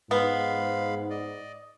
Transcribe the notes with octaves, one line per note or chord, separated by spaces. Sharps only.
G#2 G#3 B3 F5 B5
D5 D#5